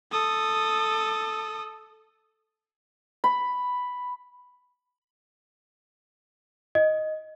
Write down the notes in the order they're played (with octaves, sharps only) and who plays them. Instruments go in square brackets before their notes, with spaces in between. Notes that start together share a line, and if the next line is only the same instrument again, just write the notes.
[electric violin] A4 D#6
[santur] B5
[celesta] D#5